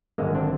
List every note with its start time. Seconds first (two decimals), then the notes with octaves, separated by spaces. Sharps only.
0.18 G#1 F#2 D3 G#3 A#3
0.35 C4 D4